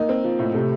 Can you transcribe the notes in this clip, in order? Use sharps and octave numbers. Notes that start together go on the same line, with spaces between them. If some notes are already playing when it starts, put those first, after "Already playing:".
Already playing: A#3 D#4
C4
F3
A2
C3 A3